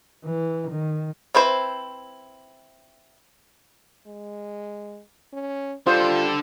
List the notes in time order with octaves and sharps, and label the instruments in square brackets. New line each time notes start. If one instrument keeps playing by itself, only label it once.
[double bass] E3
D#3
[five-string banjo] C4 E4 B4 C5
[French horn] G#3
C#4
[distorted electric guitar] D3 A4 [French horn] G3 [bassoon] F4 [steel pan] C5